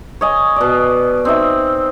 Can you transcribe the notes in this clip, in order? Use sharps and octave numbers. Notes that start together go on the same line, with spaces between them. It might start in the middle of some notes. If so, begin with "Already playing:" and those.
C#5 D#5 G#5
B2 D5
C4 D#4 E5